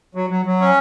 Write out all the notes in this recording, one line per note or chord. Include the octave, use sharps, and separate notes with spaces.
F#3
F#3
F#3
C#4